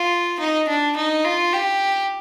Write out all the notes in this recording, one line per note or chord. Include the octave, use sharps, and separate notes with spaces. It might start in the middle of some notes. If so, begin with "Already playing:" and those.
Already playing: F4
D#4
D4
D#4
F4
G4